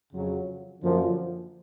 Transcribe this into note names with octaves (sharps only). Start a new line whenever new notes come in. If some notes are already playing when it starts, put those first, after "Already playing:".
F2 C#3 F#3
F#2 D3 F3 A#3